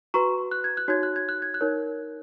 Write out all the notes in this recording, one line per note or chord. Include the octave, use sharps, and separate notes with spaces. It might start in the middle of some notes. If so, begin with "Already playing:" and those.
F#4 B4 A#5 C#6
F#6
G#6
F#6
D#4 F#4 C#5 G#6
F#6
G#6
F#6
G#6
F#6
D#4 A#4 C#5